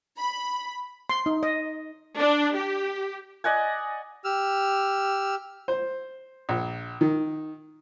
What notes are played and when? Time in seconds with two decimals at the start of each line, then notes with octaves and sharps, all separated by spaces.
0.19 B5
1.10 C6
1.26 D#4
1.43 D#5
2.18 D4
2.54 G4
3.44 D5 D#5 F#5 G#5
4.24 G4 E6 F6
5.68 C5
6.49 A#1
7.01 D#3